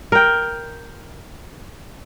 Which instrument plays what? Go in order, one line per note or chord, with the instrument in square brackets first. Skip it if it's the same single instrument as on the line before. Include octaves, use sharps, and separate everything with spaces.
[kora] A#4 G5